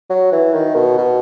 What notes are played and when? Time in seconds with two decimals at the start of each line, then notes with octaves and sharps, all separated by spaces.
0.10 F#3
0.32 E3
0.54 D#3
0.76 B2
0.98 B2